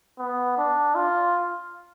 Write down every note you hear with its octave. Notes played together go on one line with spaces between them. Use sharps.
B3
D4
F4